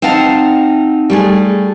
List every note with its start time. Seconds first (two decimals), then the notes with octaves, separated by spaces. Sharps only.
0.02 C4 D#4 F5 F#5 A5
1.10 G3 A3 G#4